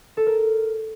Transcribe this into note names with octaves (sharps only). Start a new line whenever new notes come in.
A4
A#4